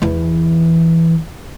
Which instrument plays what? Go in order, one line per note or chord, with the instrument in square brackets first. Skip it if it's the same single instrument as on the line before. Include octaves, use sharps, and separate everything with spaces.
[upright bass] E2 E3